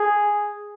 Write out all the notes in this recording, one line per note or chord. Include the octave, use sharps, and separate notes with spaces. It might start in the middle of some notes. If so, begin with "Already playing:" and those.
Already playing: G#4